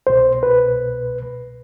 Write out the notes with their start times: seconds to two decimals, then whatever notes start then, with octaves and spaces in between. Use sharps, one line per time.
0.07 C2 B2 C5
0.43 B4